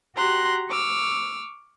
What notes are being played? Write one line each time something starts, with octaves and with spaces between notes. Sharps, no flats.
F#4 G4 A#5 C6 F#6
C#6 D6 E6 F6